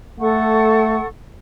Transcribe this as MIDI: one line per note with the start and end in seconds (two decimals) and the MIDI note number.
0.20 0.98 57
0.20 1.06 69
0.20 1.06 78
0.20 1.06 85